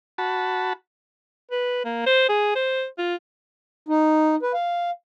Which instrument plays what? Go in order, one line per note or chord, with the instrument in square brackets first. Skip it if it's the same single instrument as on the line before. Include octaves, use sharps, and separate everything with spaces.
[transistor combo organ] F#4 A5 B5
[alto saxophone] B4
A#3
C5
G#4
C5
F4
[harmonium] D#4
B4
F5